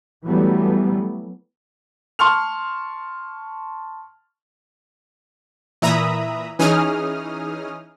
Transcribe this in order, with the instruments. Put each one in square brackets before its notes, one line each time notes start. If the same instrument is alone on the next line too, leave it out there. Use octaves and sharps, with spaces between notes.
[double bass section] E3 F#3 G3 A3 B3
[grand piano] A5 C6 C#6 F6 F7
[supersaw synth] A#2 E3 E5 A#5 B5 D#6
E3 C#4 D#4 G#4 D#6 F6